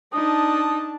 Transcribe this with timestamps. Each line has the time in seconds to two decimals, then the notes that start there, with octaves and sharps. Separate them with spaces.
0.13 D4 D#4 A5 D#6